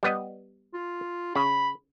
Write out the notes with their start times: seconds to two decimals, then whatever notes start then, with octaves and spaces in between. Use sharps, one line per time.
0.03 G3 B3 D#5
0.74 F4
1.36 C#3 B5